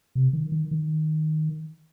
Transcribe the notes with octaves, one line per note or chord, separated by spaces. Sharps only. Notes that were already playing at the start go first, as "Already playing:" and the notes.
C3
D#3
D#3
D#3